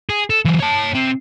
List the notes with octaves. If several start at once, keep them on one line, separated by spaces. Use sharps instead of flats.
G#4
A4
E3 F#3
C#5 A5
C3 C4